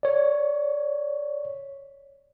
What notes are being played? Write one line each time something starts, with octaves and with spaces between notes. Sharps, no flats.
C#5 D5